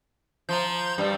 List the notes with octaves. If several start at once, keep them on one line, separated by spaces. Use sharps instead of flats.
F3 A#5 C6 G6
G2 G3